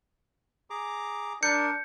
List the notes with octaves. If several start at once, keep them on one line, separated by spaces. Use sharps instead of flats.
G#4 A#5 D6
D4 A#4 G6 C#7